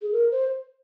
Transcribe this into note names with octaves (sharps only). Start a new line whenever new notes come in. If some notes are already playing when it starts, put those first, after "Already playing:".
G#4
A#4
C5